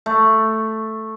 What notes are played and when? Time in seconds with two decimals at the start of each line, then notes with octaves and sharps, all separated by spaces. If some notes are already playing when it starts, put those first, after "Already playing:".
0.06 A3